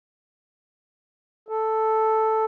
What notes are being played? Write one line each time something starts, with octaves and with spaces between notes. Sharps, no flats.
A4